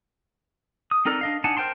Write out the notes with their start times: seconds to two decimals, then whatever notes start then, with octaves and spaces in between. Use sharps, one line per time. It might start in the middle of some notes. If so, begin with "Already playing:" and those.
0.91 D#6
1.05 C4 D#4 A4 A#4 D5
1.21 D4 D#5 F5
1.44 D4 D#4 F#5 G#5 A5
1.57 A#4 C5 G5 A5 C6